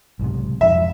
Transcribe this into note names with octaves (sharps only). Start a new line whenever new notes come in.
B1 G#2 C3
F2 G#2 E5